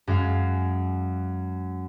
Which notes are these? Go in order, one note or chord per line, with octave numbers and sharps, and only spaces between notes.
F#2 G#3 F5